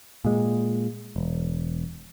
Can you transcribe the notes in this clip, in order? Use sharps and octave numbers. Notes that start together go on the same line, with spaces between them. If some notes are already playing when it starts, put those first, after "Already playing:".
A#2 G#3
E1